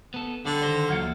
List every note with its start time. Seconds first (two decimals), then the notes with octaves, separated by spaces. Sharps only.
0.14 B3 A4
0.45 D3 G3 D5
0.63 D#3 C5 A#6
0.89 D2 E3 F#3 A#3 F4